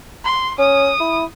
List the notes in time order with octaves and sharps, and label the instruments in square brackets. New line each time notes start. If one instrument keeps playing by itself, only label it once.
[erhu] C6
[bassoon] C#4 [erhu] D#6
[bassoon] E4